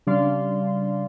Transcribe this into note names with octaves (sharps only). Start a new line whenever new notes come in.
C#3 G3 D4 D5 F5 C6